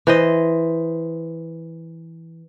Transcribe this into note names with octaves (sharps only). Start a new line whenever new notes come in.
E3 C5 D#5